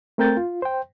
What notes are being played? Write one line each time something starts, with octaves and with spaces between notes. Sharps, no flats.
A3 C4 A#4 G5 G6 A6
F4
C5 G5